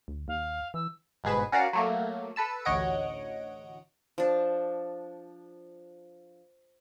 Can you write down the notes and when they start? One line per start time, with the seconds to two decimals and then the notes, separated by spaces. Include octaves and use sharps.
0.08 D2
0.28 D#2 F5
0.74 E3 E6
1.24 G1 G#2 B2 G#4 B4 E7
1.52 C#4 F#4 A#4 D5 F5 F#5
1.73 F#3 A3 A#3
2.36 A4 B4 A5 E6
2.65 A1 D2 C#5 D#5 F#5 D7
4.18 F3 D4